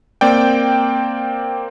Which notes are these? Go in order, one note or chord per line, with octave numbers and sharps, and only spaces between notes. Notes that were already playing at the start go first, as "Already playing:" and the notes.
A#3 C4 D5 G5